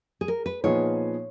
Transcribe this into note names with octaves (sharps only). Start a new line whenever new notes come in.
G#4
A#4
B4
A#2 F3 B3 D#4 G#4 C#5